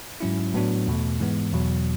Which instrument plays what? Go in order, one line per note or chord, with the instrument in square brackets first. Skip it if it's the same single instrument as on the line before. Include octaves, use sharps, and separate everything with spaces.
[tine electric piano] G#2 F#3 C#4 E4
A2 F#3 B3 D4 F#4
E2 B2 A3
G#2 E3 G#3 B3
E2 B2 F#3